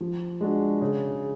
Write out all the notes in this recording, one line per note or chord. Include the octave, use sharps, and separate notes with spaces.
F3
G#3 D4 F#4
C#3